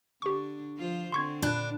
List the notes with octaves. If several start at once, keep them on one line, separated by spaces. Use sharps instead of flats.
D3 D4 G4 C#6
F3 F4 C5
D3 C4 C6 C#6 G#6
A#2 D4 B5 F#6